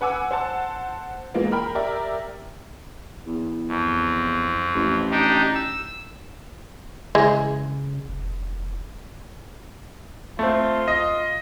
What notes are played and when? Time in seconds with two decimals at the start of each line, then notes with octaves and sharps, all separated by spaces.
0.01 B4 F#5 G#5 D6 E6
0.31 C5 F#5 A5
1.34 E3 F3 G#3 A#3 B3
1.52 A#4 G5 B5 F6
1.75 G4 A#4 D5 E5
3.26 E2
3.68 F2
4.75 A1
5.11 D4 D#4 G4
5.55 E6
7.15 C#3 E3 G#3
8.09 F1
10.39 A3 C4 F4
10.88 D#5